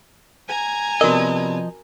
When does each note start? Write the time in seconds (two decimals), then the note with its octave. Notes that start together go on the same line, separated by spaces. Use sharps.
0.47 G#5 A#5 G#6
1.01 C3 F3 B3 D4 F#4 A#4 D#5